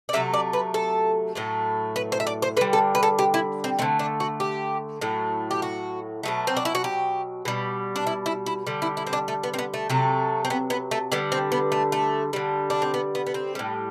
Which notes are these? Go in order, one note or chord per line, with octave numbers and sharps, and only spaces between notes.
D5
C3 F#3 A3 E5
D5
B4
A4
A2 F#3 A3
B4
C5
E5
D5
C5
D3 G3 B4
A4
B4
A4
G4
E4
C4
D3 A3 C4
D4
F#4
G4
A2 F#3 A3
G4
F#4
B2 F#3 A3
C4
D4
E4
F#4
G4
B2 G3
D4
E4
E4
E4
D3 G3
E4
E4
C4
D4
A3
B3
C4
B3
A3
C3 F#3 A3
C4
B3
B3
A3
D3 G3 B3
C4
B3
A3
A3
D3 G3
D4
C4
B3
B3
B3
C4
A2 G3